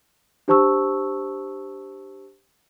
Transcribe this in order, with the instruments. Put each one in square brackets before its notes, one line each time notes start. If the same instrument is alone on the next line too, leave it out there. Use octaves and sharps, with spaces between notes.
[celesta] D4 G4 C5 A5 C#6 E6